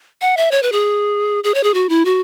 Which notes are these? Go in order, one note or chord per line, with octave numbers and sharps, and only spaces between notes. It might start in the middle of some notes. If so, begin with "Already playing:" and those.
F#5
E5
C#5
B4
G#4
G#4
C#5
G#4
F#4
E4
F#4